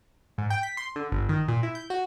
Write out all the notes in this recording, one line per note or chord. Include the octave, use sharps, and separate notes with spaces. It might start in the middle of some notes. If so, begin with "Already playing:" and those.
G#2
G5
B6
C6
D3
G1
D#3
A#2
E4
G6
F#4